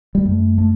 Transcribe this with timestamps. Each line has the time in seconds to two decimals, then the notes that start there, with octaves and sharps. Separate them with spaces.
0.15 G3
0.25 F#2 A3
0.58 A3